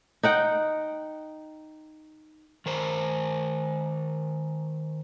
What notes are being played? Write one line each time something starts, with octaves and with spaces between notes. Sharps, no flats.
D#4 F#5 G5
D#3 A#4 C5